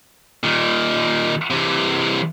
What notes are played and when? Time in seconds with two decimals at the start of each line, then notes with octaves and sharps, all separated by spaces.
0.43 A#2 D#3
1.50 C3 E3